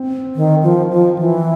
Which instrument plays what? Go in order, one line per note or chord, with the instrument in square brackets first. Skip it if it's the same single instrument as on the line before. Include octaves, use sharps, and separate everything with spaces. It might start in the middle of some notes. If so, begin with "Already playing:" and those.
Already playing: [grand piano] C4
[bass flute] D#3
F3
F3
E3